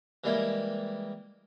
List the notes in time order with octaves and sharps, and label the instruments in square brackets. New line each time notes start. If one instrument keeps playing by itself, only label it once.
[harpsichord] E3 G3 G#3 A#3 E4